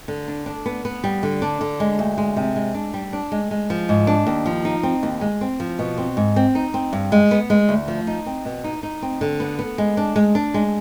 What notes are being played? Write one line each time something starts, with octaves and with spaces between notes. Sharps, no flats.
D3
D4
D4
B3
B3
G3
D3
D4
D3
G#3
D2
G#3
C3
G#3
D4
G3
D4
G#3
G#3
F3
G#2
D4
D#2
F3
D#4
C4
D#2
G#3
C4
F3
B2
C4
G#2
C4
D#4
C4
G2
G#3
B3
G#3
D2
F3
D#4
C4
B2
D#4
D#4
C4
D3
B3
B3
G#3
D4
G#3
D4
G#3